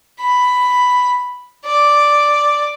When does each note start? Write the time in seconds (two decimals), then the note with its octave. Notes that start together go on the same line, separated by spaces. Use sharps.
0.20 B5
1.65 D5